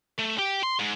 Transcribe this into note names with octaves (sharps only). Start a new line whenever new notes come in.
A3
G4
C6
G#2